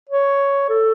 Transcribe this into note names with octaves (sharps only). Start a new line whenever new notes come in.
C#5
A4